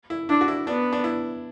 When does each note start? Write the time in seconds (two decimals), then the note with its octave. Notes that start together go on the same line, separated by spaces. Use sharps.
0.10 E4
0.29 D4 E4
0.41 F#4
0.48 E4
0.66 B3 D4
0.93 D4
1.04 E4